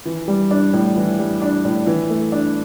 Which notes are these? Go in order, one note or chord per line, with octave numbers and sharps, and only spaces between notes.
E3
G3
D4
A2
E3
G3
D4
A2
E3
A3
D4